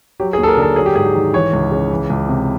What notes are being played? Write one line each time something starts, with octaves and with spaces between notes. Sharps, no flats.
F#3 G4
G#4
D#2
A4
A#4
D3
A4
F#3 G#4
G4
G#2 G#4
G4
D#3
E3 C#5
C#2
C#3
E3
C#2
C3